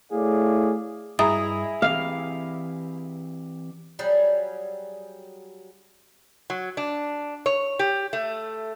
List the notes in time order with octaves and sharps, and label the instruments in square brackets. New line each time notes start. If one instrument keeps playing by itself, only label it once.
[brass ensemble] A3 E4 G#4 C#5 D5 F5
[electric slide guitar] G2 D#5 [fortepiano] E4 G#4 A#5 [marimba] D#6
[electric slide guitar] E3 C4 G4 [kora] F5
[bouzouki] F#3 G3 G#4
[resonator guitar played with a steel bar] F#3
D4
C#5
G4
A3